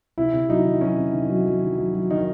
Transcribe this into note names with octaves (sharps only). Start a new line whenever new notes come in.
C3 E4
C3
F#3 D#4
D#3
F#3 C#4
C3
D#3
F#3
F#3
D#3
F#3
F#3
D#3 D#4